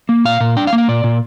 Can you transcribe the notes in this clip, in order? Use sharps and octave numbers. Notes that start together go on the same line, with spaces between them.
A#3
A#2 F5
A#2
D4 G5
F5
A#3
F5
A#2 D5
A#2